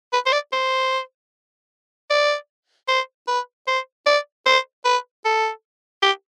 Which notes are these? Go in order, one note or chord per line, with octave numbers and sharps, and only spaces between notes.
B4
C5
D5
C5
D5
C5
B4
C5
D5
C5
B4
A4
G4